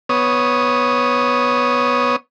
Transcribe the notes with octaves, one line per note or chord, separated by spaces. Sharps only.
B3 C#5 D#6